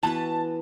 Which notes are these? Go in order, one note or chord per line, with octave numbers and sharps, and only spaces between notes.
E3 B3 F#4 B4 A5